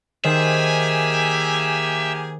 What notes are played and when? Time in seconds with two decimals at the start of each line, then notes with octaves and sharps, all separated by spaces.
0.24 D#3 A#3 G4 G#4 C5 E5 G#5